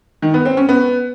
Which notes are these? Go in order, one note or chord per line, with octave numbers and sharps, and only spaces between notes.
D#3
B3
C4
C#4
B3